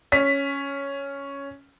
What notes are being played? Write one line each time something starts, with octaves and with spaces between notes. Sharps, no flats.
C#4 B6